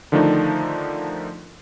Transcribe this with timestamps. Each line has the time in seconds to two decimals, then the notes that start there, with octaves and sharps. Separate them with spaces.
0.12 D3 D#3 F3 A3 D4 D#4